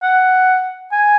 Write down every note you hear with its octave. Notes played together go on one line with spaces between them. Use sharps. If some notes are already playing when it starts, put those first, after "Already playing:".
F#5
G#5